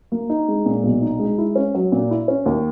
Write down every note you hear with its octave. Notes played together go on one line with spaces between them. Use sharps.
A#3
D#4
G#3
A#2
B1
D#4
G#3
E4
C#4
F#3
A#2
E4
C#4
D#2